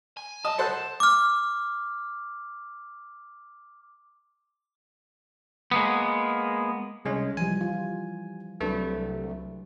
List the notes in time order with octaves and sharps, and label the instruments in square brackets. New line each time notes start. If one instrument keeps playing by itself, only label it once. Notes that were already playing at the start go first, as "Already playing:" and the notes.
[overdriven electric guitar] G#5
[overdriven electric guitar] B1 A5 [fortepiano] D#5
[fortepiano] A4 C5 F#5
[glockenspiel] D6 F6
[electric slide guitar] G#3 A#3 B3
[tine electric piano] C2 G#3 C#4
[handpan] E3 F3 G3 [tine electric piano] G#5
[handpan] F4
[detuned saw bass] C2 [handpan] F#3 D4 B4 [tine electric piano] A3